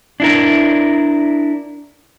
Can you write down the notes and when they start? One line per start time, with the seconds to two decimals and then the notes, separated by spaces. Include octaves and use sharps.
0.20 D4 E4 A#4